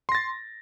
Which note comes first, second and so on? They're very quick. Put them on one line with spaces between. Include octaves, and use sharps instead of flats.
C6 A#6 A6